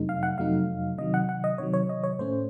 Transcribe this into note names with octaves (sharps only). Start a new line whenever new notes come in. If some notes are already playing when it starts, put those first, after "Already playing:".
Already playing: F2 C3 F#3 A3 D#4
F5
F#5
F2 C3 F#3 A3 D#4 F5
C3 D#3 F#3 D#5
F#5
F#5
D#5
C3 D#3 F#3 C#5
C#5
D#5
C#5
A2 A3 C#4 C5